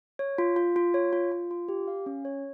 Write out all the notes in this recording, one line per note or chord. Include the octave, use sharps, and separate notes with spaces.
C#5
F4
F4
F4
C#5
F4
F4
F4
G4
F5
C#4
C#5